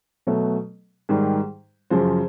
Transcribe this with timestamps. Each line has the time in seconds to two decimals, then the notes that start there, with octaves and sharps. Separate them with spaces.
0.27 B2 F#3 A3
1.09 G#2 D#3 G3
1.90 F#2 C#3 F3 C5